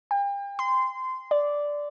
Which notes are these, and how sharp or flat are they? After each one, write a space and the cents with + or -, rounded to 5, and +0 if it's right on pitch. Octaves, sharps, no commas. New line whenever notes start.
G5 +40
C6 -20
D5 -5